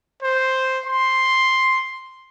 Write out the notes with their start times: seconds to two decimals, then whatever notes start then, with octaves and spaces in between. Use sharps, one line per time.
0.23 C5
0.87 C6